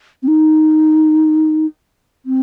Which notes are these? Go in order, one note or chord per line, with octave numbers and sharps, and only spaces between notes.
C4
D#4
C4